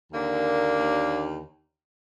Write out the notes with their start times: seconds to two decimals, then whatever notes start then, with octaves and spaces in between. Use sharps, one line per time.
0.12 D#2 D3 A#3 D4
0.79 D#2 D3